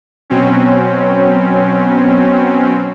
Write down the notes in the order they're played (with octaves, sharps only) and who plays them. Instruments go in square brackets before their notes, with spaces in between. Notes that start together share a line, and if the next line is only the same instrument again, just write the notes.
[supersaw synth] B2 F#3 C4 C#4